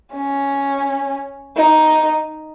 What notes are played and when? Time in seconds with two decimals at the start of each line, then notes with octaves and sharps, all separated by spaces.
0.13 C#4
1.56 D#4